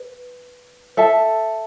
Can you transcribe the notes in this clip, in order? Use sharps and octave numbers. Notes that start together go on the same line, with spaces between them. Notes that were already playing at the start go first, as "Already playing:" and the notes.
Already playing: B4
A4 E5 A5